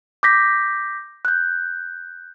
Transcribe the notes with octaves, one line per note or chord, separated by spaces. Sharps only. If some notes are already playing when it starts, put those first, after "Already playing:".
D6 G6 A#6 B6
F#6 G6